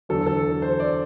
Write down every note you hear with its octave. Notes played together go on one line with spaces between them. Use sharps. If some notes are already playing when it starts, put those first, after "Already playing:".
E2 D3 F#3 A4
A4
C5
D5